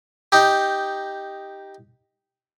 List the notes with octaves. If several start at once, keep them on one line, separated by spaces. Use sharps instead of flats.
D#4 G4